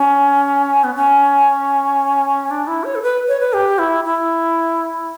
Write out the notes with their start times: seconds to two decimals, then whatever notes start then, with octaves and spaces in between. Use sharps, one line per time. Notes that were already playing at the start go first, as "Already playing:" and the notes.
Already playing: C#4
0.84 B3
0.95 C#4
2.51 D4
2.67 E4
2.84 C#5
2.95 A4
3.02 B4
3.28 C#5
3.40 B4
3.53 G4
3.79 E4
4.04 E4